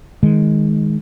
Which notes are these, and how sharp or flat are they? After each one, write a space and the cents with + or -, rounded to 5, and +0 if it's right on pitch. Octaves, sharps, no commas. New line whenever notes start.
D#3 +0 G#3 +0